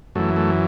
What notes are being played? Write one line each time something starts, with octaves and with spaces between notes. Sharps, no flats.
F#2 E3 A3
A3